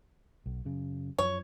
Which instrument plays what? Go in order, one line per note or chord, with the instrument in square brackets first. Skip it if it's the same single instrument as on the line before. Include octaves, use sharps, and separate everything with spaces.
[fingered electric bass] B1
F#2 C#3
[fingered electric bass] F#2 F3 [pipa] C#5